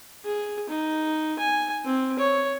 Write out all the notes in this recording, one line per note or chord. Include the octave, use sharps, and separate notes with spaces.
G#4
D#4
G#5
C4
C#5